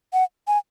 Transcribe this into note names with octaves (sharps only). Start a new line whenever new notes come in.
F#5
G#5